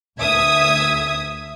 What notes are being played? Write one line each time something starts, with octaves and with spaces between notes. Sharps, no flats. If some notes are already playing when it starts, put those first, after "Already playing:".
D2 E5 D#6 G#6